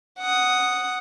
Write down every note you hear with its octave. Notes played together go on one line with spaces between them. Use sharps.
F#5 D#6